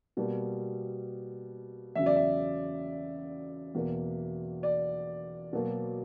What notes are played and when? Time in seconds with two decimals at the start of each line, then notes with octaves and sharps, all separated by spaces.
0.17 B2 G3 A#3
1.95 E2 C#3 F#3 E5
2.06 D5
2.16 E5
3.75 E2 B2 A#3
4.63 D5
5.53 B2 F#3 A#3